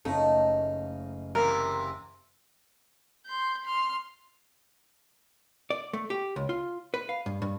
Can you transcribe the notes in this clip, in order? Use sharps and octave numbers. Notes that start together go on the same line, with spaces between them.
F#1 A3 C#4 D#4 F5
C3 E3 A#3 A#4
C6 G6
C6 F6
D5
A3
G4
C#2
F4
B4
F5
G2
G2